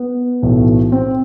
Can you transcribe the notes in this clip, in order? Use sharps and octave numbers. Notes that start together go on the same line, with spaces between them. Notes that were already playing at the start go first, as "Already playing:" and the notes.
Already playing: B3
B1 A2 E3 A3
C4